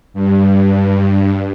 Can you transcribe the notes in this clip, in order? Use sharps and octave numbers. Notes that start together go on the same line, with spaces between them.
G2